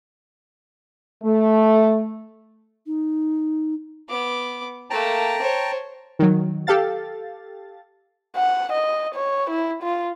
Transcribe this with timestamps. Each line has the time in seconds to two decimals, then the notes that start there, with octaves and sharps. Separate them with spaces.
1.24 A3
2.86 D#4
4.09 B3 D6
4.90 A3 A#3 G5 A5 A#5
5.41 C5 C#5
6.19 D#3 F#3
6.67 G4 A4 F5 A6
8.36 F#5
8.73 D#5
9.15 C#5
9.50 E4
9.83 F4